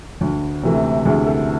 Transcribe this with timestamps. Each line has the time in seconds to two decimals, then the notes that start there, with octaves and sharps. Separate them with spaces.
0.21 D2
0.63 C3 E3 A3
1.05 D2 G#4
1.26 A4